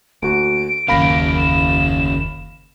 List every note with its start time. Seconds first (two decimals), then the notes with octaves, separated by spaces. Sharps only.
0.22 D2 A#3 F#4 D7
0.88 F#1 D#2 C#3 A#3 F5 B5 A#6
1.38 E7